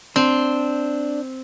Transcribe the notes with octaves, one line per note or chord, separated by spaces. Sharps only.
C4 D4